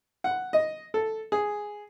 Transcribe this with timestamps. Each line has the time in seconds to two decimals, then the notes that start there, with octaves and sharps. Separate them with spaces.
0.24 F#5
0.53 D#5
0.94 A4
1.32 G#4